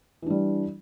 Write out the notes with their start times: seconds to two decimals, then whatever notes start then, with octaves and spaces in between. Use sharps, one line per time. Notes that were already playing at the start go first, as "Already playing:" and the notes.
0.22 E3
0.26 D4
0.30 G3